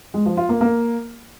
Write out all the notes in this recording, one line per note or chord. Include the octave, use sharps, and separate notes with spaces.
G#3
F3
F4
A#3
A#3